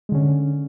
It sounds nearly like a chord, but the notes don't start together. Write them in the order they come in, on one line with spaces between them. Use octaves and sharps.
G#3 D3 C#4